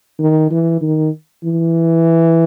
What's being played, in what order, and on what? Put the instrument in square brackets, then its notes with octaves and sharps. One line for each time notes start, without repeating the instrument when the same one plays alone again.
[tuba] D#3
E3
D#3
E3